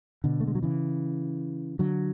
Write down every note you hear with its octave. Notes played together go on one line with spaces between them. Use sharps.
B2 D3
A3
G#3
F#3
C#3 E3
D3 F#3